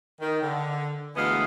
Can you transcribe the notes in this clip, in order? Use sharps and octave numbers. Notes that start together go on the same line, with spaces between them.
D#3
D3
D2 E3 G#3 B3 D#5 F5